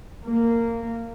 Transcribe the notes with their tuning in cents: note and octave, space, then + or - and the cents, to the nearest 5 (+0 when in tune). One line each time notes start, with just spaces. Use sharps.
A#3 -15